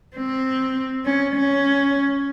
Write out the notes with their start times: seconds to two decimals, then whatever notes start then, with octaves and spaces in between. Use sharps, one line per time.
0.16 C4
1.05 C#4
1.35 C#4